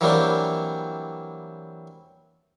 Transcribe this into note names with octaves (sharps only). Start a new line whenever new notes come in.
E3 F#3 G3 A#3 C4 D4